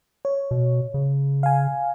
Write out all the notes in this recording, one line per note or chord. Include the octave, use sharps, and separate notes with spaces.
C#5
B2
C#3
F5 G#5